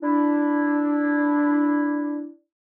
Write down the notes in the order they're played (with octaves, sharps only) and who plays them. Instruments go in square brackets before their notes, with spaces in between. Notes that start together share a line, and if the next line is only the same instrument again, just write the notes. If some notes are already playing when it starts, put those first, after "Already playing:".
[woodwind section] D4 E4